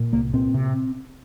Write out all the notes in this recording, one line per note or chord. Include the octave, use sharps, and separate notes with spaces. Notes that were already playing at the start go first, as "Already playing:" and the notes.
Already playing: A#2
C2 A#3
A#2 C4
C3